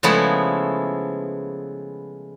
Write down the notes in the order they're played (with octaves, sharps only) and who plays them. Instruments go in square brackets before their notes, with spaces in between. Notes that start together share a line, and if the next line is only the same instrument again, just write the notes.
[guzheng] C#3 F3 G#3 A3 B3 E4